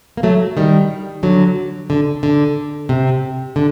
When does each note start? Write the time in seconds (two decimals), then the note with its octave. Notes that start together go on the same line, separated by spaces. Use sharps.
0.17 A#3
0.23 F#3 A3
0.57 D#3 G3
1.23 D3 F#3
1.90 D3
2.23 D3
2.89 C3
3.56 D3